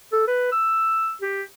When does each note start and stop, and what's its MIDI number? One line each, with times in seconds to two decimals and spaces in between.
0.13 0.26 69
0.27 0.49 71
0.52 1.13 88
1.22 1.44 67